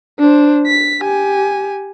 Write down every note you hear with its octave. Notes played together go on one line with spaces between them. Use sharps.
D4 C5
B6
G4 G#5